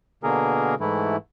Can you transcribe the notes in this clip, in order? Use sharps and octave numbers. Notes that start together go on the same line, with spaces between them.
B2 D3 A#3 G#4 A#4
G#2 E3 A3 E4